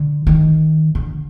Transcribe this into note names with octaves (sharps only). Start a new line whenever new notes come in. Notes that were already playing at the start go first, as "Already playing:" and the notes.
Already playing: D3
D#3
D3